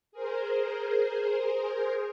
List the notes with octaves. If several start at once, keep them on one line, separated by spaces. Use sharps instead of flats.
G#4 A#4 C5